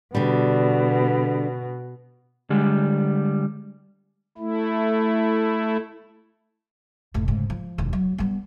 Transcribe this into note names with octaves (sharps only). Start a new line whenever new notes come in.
B2 D3 G3
D3 G3 G#3
A3 E4
F1 A2
G#2 C#3
F3
E1 D#2
F#3
G3 B3